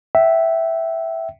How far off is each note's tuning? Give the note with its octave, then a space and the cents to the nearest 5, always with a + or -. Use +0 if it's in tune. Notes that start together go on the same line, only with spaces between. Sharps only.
E5 +0 G5 -35